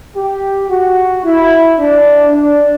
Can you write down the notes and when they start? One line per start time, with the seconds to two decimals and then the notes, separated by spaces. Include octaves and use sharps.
0.16 G4
0.70 F#4
1.25 E4
1.79 D4
2.34 D4